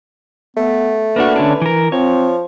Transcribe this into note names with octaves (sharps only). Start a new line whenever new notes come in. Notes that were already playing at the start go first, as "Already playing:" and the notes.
A3 B3
A#3 D4 F#4 B4
D3 C#4 D4
E3 A#4
F3 C4 C#5